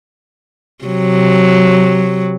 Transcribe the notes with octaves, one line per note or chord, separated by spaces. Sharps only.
C3 F#3